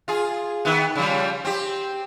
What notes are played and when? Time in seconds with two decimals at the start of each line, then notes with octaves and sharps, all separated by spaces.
0.08 F4 G#4
0.65 D#3 B3
0.95 C#3 F3 G3
1.45 C4 G4